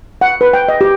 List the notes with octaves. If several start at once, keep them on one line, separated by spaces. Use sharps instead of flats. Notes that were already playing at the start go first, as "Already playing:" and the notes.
F#5
B4
G5
D#5
G4